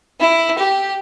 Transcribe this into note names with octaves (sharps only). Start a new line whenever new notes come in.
E4
G4